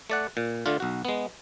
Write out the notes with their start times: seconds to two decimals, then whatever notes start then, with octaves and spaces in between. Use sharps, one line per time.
0.10 A3 D5 F#5
0.37 A#2
0.66 D3 A3 D4 F4
0.80 B1 F#4
1.05 G#3 B3